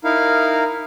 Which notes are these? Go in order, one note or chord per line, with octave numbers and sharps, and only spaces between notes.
D#4 E4 A#4 F5